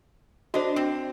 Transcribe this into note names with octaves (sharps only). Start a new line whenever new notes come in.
D4 F#4 C5 D#5
C4